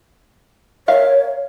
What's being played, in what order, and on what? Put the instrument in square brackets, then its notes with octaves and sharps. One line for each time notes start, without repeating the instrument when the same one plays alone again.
[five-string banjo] A#4 E5 F5 [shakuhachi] C#5